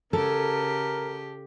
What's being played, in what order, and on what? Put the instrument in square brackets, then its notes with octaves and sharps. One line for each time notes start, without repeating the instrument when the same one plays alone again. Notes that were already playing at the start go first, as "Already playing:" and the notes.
[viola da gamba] C#3 G4 [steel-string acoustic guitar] A4 [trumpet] A#4